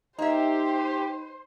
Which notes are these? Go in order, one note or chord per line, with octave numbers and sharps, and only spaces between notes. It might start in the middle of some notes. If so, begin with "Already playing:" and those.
A#3 D#4 G4 C5 E5